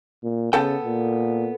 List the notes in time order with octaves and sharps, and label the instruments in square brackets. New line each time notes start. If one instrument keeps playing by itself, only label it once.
[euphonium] A#2
[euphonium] C#3 [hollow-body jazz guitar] B3 A4 G5
[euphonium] A#2